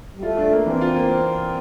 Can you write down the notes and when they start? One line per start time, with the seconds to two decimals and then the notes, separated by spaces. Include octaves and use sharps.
0.16 G3
0.22 A3 F4
0.37 D4
0.52 A#3
0.66 E3 C4
0.81 F4
0.96 A#3